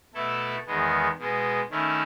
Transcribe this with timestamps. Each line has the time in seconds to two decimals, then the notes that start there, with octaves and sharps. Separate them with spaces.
0.14 B2 A3 E4 A4
0.66 E2 D#3 G#3 B3
1.18 B2 G#3 B3
1.70 D#3 A3 C#4 E4